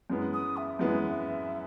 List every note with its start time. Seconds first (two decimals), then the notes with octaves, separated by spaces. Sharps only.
0.10 F#2 E3 G#3 B3
0.33 D#6
0.57 E5
0.79 F#2 E3 G#3 B3